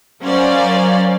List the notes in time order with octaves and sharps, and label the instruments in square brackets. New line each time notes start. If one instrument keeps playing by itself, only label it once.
[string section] F#3 C#4 A#4 C5 D5 F5